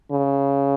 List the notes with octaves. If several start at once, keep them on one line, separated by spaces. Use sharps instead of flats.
C#3